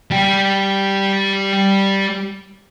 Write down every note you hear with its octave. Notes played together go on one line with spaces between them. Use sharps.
G3 G4